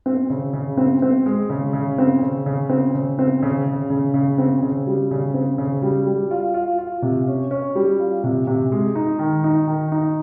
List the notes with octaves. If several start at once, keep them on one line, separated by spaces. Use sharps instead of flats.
C4
C#3
C#3
C4
C4
G#3
C#3
C#3
C4
C#3
C#3
C4
C#3
C4
C#3
C#3
C#3
C#3
C4
C#3
G3
C#3
C4
C#3
G3
G3
F4
F4
F4
C3
C#4
C#4
G3
F4
C3
C3
G#3
D#4
D#3
D#4
D#3
D#4